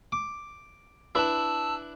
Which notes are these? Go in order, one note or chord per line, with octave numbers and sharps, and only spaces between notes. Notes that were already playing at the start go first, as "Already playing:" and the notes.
D6
D4 E4 B4 A5 E6